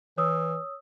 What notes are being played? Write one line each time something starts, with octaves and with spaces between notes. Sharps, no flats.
E3 C#5 D#6 E6